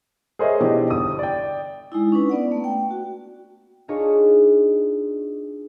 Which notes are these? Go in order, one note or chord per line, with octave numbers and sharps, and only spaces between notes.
G#4 A#4 C5 C#5 D#5 E5
B2 E3 D4 D#4 G4
G1 D#6
D5 G5
G#3 D#4 E4
C#4 D4 B4
B3 D5 F#5
A3 A#3
G5
F#4
D4 D#4 F4 G#4 C#5